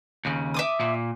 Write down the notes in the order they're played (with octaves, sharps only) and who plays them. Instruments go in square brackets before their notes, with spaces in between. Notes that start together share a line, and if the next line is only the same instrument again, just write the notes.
[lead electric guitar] D#2 C#3
[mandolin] E5 D6 D#6
[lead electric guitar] A#2